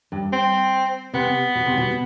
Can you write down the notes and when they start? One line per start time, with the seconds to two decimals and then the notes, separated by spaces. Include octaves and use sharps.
0.12 G2
0.33 C4
1.13 C3 B3
1.55 B2
1.66 C3
1.77 B2